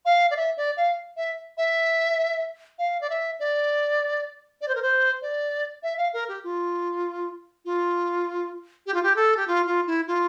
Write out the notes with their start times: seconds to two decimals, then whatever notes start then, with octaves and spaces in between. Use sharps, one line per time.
0.05 F5
0.31 D5
0.36 E5
0.57 D5
0.77 F5
1.17 E5
1.57 E5
2.78 F5
3.01 D5
3.10 E5
3.39 D5
4.61 D5
4.68 C5
4.75 A#4
4.82 C5
5.22 D5
5.83 E5
5.97 F5
6.13 A#4
6.28 G4
6.44 F4
7.65 F4
8.86 G4
8.94 F4
9.03 G4
9.16 A4
9.37 G4
9.47 F4
9.66 F4
9.87 E4
10.07 F4